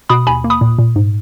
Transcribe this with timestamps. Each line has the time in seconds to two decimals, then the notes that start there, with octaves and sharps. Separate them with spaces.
0.09 B2 B5 D#6
0.27 D#2 G#5 B5
0.44 A#3
0.50 B5 D#6
0.61 A#2
0.79 A#2
0.96 G#2